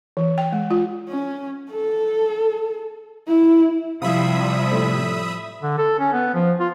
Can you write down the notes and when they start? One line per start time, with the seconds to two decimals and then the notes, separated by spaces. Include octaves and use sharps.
0.17 E3
0.38 G5
0.52 G#3
0.71 F4
1.08 C#4
1.71 A4
3.28 E4
4.02 C3 F3 G3 E4 E5 F5 B5 D#6
4.71 A2
5.62 D3
5.78 A4
5.99 C#4
6.13 B3
6.34 F3
6.60 F4